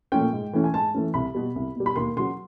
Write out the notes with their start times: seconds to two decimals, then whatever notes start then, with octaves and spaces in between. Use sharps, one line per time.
0.12 A#2 F3 A3 C#4 G5
0.33 G#2
0.53 E3 A3 C#4
0.64 G#5
0.74 G#2 A5
0.94 E3 A3 C#4
1.14 C2 B5
1.34 B2 G3
1.56 C2
1.76 B2 G3
1.86 B5
1.96 D#2 C6
2.16 C#3 F#3 C6